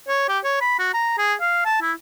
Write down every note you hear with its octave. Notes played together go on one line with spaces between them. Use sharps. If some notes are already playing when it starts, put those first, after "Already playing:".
C#5
G4
C#5
B5
F#4
A#5
G#4
F5
A5
E4